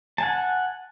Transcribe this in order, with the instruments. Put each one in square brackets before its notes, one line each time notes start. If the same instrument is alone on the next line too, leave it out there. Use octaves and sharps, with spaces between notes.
[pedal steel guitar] F#5 G#5 A5